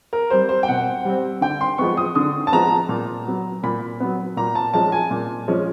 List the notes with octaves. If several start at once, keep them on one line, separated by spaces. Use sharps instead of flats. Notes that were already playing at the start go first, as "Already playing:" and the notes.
A#4
G3 C4 C5
C5
G5
B2 F#5
G3 C4
D3 G5
C6
F3 G#3 B3 C#6
D#6
D3 D#6
A5
F3 G#3 B3 A#5
A#2
F#3 B3
A#2 B5
F#3 B3
A#2 A#5
A5
F3 G#3 C#4 A5
G#5
A#2
F3 G#3 C#4